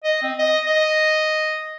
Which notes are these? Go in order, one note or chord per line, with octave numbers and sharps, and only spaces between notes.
D#5
C4
D#5
D#5